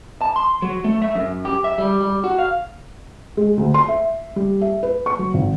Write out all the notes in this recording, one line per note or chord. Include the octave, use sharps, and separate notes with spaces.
A5
C6
F#3
A3
E5
F#2
G4
E5
G3
G3
F#4
F5
G#3
D2
C6
E5
G3
E5
B4
C#6
F#3
G#1